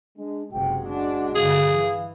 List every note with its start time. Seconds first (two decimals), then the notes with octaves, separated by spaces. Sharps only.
0.17 G#3 D4
0.52 F#1 C3 G#3 F#4 G5
0.88 D4 F#5
1.35 G2 D3 G#4 F5
1.74 E3